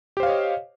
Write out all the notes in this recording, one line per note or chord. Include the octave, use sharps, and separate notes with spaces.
G4 C5 C#5 D#5 F5